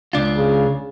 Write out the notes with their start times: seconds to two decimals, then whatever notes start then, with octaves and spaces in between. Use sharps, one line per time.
0.13 C#2 D4 F4
0.38 C#3